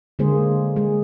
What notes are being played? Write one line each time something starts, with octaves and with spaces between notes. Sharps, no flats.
D3 G#3 A#3 G#4 C5
G#3 G#4